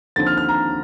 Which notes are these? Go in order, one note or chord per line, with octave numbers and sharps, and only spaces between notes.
D#2 D3 F3 C4 A6
F6
F6
A#5